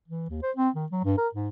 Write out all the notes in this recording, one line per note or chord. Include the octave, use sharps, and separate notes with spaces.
E3
D#2
C5
C4
D#3
F#3
G2
A#4
G#2